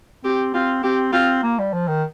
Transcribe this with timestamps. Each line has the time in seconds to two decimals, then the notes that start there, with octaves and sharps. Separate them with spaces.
0.24 C4 G4
0.54 C4 F4
0.83 C4 G4
1.13 C4 F4
1.43 A#3
1.58 G3
1.73 F3
1.88 D#3